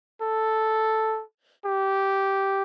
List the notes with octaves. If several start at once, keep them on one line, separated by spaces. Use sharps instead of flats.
A4
G4